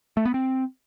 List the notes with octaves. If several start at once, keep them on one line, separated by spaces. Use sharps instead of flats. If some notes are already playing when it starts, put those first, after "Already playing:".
A3
B3
C4